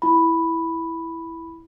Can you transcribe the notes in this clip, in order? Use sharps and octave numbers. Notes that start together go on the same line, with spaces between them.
E4 B5